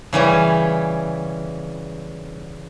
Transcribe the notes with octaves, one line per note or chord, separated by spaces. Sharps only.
C#3 E3 G3 C#4